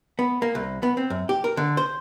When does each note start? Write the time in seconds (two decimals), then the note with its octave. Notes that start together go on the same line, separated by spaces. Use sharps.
0.19 B3
0.42 A#3
0.55 C2
0.83 B3
0.97 C4
1.10 F#2
1.29 G4
1.44 A#4
1.57 D3
1.77 C5